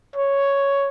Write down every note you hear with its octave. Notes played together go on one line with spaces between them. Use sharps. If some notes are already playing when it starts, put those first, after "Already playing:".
C#5